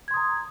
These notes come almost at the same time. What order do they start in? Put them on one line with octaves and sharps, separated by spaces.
G#6 C6 D#6 A#5